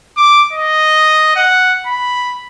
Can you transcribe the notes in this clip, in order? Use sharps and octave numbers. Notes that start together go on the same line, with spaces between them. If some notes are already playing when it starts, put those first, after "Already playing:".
D6
D#5
F#5
B5